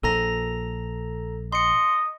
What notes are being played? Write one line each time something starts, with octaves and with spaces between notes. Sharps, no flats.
A#1 A#2 A4 A#5 A#6
D#5 C6 C#7